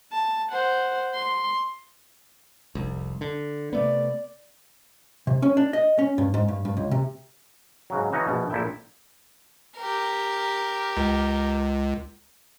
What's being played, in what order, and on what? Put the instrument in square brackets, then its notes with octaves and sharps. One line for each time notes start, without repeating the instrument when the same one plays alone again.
[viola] A5
C5 F#5
C6
[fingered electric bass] F1 C2
D3
[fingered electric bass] C3 A3 B3 [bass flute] D5
[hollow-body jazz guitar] C3
C#4
D4
D#5
C#4
G2
G#2
G2
G2
C#2
C3
[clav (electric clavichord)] G#2 C#3 F#3
E3 C#4 D#4 F#4
A#1 B2
A#1 A#2 E4 A4 E5 G5
[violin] G4 A#4
[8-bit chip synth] C#2